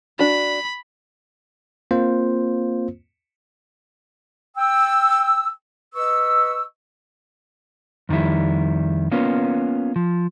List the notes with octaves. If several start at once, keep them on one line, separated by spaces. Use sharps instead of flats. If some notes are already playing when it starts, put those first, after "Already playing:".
D4 F#4 B5
A#3 C4 F4 C5
G5 E6
B4 D#5 C#6 E6
F2 D#3 G3 E4
A#3 B3 C#4 F4
F3